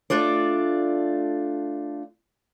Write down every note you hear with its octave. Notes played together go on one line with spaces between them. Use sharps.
A3 D4 F4 D5